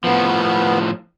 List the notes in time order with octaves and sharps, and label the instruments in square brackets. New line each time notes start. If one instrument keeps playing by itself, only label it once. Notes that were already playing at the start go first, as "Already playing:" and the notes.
[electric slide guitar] A2 F3 [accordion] B3